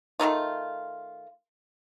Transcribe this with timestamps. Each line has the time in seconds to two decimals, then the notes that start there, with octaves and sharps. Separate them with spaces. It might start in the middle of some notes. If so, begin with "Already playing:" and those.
0.20 D#3 A3 D#4 F4